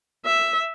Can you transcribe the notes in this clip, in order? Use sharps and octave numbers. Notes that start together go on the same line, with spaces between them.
E5